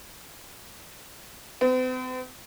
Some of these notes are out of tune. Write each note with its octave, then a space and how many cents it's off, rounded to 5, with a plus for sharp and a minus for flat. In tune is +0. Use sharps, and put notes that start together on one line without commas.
C4 -45